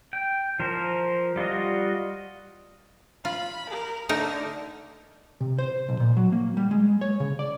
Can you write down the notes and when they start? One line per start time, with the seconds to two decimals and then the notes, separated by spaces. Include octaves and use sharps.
0.13 G5
0.60 F3 A#4 C5
1.36 G3 F4 F#4 D#5
3.25 F4 B5
3.70 A#4
4.09 D3 A3 D#4 A#4
5.41 C3
5.59 C5
5.89 B1
6.00 A#2
6.17 F#3
6.32 A#3
6.57 G3
6.71 G#3
7.01 C#5
7.20 C#3
7.39 D5